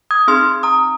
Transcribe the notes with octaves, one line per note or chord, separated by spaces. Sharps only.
D#6 G#6
C4 D#4 G#4 C6 F6
A#5 D#6